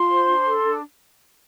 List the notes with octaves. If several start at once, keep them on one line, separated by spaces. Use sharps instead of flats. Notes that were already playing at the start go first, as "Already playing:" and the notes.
Already playing: F4 C6
C5
D4
A4
D4